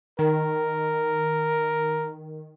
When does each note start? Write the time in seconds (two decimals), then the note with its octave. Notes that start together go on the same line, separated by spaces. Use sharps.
0.19 D#3 A#4